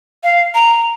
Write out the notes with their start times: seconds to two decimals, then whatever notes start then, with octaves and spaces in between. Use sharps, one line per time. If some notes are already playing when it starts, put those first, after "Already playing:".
0.23 F5
0.55 A#5